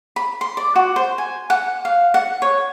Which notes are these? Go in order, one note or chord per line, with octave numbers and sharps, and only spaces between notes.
B5
C6
D5
F#4
C5
G#5
F#5
F5
F#5
C#5